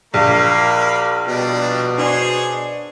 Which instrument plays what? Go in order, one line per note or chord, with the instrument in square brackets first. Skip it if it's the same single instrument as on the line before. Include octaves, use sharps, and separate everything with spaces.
[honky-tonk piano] A#1 [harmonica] A#3 F#4 B5 [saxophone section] A#4 F5
[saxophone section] B2 [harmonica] G3 D4 F4
[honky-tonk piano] D4 [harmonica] G#4 C5 C#5